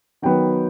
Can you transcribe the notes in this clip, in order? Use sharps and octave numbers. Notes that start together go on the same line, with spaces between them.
D#3 F#3 B3 G5